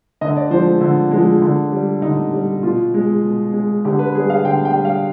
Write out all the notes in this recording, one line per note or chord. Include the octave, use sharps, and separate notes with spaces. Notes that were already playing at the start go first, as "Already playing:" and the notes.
D3 D#5
D5
F3 G#3 C5
D3
F3 G#3
D3
G3
D3 D#4
G3
B2 F4
G#3
B2
G#3
D3 G4
B4
G3 G#4
F5
D3 G5
G5
G3
F5